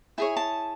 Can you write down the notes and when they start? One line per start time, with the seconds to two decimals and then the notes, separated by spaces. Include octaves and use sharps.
0.18 E4 G#4 C#5 G#5
0.37 A5